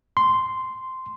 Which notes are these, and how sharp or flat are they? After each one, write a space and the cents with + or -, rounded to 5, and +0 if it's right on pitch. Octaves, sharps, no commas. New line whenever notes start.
C6 -5